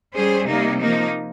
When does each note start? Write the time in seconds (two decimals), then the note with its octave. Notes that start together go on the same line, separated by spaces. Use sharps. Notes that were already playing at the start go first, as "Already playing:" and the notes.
0.16 G3 C#4 G#4 C5
0.48 C3 G3 A#3 D#4
0.80 F3 A#3 D#4